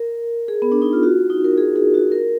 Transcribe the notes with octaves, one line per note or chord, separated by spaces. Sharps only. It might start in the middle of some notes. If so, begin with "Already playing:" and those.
Already playing: A#4
G#4
B3
D4
D#4
F4
F#4
D#4
A#4
G#4
G#4
F#4
A#4